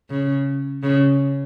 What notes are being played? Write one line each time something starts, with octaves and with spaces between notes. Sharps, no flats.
C#3
C#3